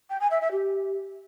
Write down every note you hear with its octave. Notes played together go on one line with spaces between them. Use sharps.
G5
G#5
E5
E5
G4